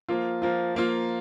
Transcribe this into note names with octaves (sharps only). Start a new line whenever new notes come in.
F3 A#3 F4
F3 A#3 F4
F3 A#3 F4